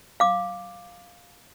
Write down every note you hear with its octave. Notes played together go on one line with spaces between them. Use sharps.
F5 D6